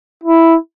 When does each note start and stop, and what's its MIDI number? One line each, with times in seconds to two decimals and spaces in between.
0.24 0.56 64